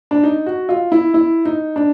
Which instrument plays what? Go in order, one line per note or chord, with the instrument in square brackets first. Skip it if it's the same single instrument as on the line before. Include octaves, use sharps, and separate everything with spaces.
[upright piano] D4
D#4
F#4
F4
E4
E4
D#4
D4